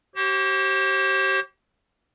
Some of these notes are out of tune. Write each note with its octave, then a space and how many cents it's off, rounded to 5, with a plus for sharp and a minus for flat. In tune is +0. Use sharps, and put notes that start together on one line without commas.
G4 -35 C5 +35